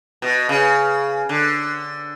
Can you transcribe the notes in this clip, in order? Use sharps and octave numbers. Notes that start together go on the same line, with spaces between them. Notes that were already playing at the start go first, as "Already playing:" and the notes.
B2
C#3
D3